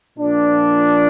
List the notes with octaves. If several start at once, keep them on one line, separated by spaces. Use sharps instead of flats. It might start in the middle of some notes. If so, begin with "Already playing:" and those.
A#2 F3 D4